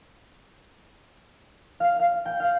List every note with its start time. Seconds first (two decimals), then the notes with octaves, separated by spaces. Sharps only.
1.80 F5
2.00 F5
2.25 G5
2.40 F5